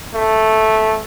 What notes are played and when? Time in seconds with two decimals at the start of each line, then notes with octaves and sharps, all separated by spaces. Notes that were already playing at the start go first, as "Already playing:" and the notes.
0.14 A3